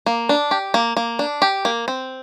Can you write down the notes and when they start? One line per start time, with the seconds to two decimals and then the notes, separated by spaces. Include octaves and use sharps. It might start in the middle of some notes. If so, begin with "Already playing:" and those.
0.06 A#3
0.29 D4
0.51 G4
0.74 A#3
0.97 A#3
1.19 D4
1.42 G4
1.65 A#3
1.88 C4